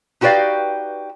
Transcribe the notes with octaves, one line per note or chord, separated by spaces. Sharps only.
D#4 F#4 G4 B4 D5 F5